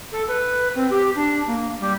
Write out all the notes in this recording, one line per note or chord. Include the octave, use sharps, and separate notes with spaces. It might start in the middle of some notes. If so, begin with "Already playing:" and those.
A4
B4
C4
G4
D4
A#3
G3